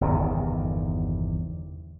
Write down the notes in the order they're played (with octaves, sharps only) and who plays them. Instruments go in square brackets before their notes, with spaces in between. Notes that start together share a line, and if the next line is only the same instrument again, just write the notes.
[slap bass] G1 E2 C3 D#3